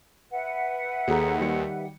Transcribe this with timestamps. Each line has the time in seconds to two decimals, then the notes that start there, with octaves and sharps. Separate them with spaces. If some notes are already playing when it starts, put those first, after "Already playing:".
0.31 B4 E5 F#5
1.08 D#2 G#4 A4 A#5
1.39 D#3 G3 C#7